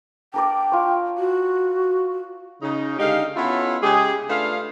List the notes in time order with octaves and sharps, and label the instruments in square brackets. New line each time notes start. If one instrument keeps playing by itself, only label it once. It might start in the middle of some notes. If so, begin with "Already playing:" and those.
[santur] D4 A#4 D5 [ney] G5
[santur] F4 C#5
[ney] F#4
[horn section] C#3 D#4
D3 G#3 D#4 G4 F5
B3 C#4 E4 F4 A4 C#5
C#3 G#3 G4 G#4
A3 D4 F4 B4 F5